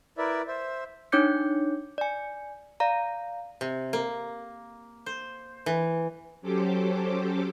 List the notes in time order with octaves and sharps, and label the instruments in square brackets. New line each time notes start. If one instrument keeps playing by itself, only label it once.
[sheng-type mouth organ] E4 A#4 B4 D5 E5
C5 E5
[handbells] D4 D#4 C#5 D6 G6 C#7
D5 G#5
D5 F5 A#5
[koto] C3
A#3
C5
E3
[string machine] F#3 C#4 G4 A4 C5 D6